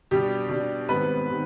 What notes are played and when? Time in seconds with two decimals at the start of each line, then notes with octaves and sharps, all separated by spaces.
0.11 B2 G3 D4 G4
0.49 B2 G3 D4
0.89 G#2 D#3 G3 B3 C4 B4
1.27 D#3 G3 C4